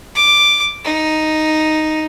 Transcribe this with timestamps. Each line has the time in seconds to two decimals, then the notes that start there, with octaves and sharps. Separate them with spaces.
0.15 D6
0.85 D#4